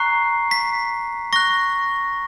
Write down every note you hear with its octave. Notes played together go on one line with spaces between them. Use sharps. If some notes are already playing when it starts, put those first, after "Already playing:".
Already playing: A#5 C#6 F#6 C7
B6
C#6 F#6 A#6